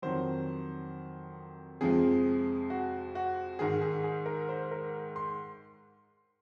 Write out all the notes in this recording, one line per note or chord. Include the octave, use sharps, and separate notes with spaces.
F2 D#3 F#3 C5
F2 C3 F3 G#3 G#4
F#4
F#4
G#2 D#3 G#3 G#4
G#4
G#4
A#4
C5
A#4
C6